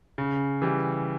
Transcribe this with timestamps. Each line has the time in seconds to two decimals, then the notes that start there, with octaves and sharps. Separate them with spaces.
0.18 C#3
0.62 E3 G3